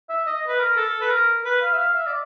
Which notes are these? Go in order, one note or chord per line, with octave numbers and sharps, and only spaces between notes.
E5
D#5
B4
A#4
A4
B4
A#4
B4
F5
E5
F5
E5
D5